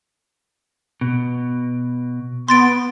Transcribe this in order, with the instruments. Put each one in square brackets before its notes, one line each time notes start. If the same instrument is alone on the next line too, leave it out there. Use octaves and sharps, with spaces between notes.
[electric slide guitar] B2
[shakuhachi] B3 [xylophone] C6 A6 D7